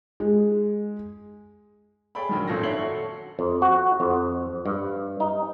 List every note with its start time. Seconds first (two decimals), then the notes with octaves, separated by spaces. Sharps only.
0.20 G#3
2.15 G#4 C#5 D5 G5 B5
2.29 A#1 D#3 F#3
2.48 G#1 F#2 A#2 A4 A#6
2.63 C#5 D5 E5 C7 F#7 G7
2.78 F#4 A4 C#6
3.39 F2
3.62 F#4
4.00 F2
4.66 G2
5.20 D#4